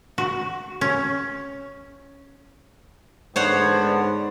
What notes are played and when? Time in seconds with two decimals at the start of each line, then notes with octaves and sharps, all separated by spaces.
0.18 F#4
0.81 C#4
3.36 G#2 D3 B3 D4 C5 C#5 F#5